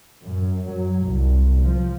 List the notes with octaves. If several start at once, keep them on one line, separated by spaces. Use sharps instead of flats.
F#2
F#3
C2
F3